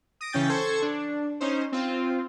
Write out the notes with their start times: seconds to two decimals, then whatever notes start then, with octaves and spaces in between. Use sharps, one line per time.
0.21 D#6 A#6 D7
0.32 C#3 E3 C#4 G5 G6 A6
0.49 A4 C5 C#6 G#6
0.82 D4
1.40 C#4 D#4 C5
1.72 C4 F4